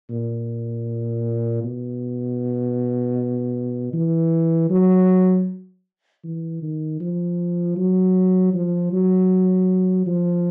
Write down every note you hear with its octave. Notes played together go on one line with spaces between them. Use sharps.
A#2
B2
E3
F#3
E3
D#3
F3
F#3
F3
F#3
F3